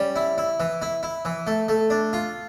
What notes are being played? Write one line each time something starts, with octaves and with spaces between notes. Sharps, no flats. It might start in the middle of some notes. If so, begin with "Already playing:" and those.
Already playing: G3 C#4
E4
E4
E3
E4
E4
E3
A3
A3
D4
F4